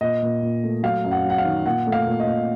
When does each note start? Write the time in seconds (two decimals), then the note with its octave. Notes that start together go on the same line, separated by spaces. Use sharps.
0.01 A#2 D#5
0.22 A#2
0.42 A#2
0.63 A3
0.83 F#3 F5
1.05 F#2
1.11 F#5
1.25 F#3
1.30 F#5
1.38 F5
1.45 D#3
1.66 A#2 F#5
1.87 A3
1.92 F5
2.07 A#2
2.20 D#5
2.27 A#2